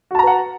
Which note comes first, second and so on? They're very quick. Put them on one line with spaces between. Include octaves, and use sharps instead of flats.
F#4 A5 A#5 B4 F#5